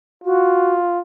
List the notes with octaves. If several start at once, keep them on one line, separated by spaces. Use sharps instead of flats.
F4 F#4